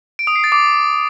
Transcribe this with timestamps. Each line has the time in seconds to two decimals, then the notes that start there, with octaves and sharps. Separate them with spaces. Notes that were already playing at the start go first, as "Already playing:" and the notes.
0.19 D7
0.27 D#6
0.36 C7
0.44 A6
0.52 D6